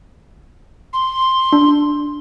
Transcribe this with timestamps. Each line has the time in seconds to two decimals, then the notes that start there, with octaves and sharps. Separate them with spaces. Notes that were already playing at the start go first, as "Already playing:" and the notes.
0.93 C6
1.53 D4